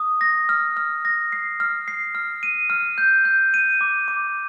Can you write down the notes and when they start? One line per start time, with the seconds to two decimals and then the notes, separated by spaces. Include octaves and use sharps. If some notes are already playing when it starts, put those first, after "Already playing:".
Already playing: D#6
0.21 A#6
0.49 F6
0.77 F6
1.05 A#6
1.32 C7
1.60 F6
1.88 C7
2.15 F6
2.43 D#7
2.70 F6
2.98 G6
3.25 G6
3.54 D#7
3.81 D6
4.08 D6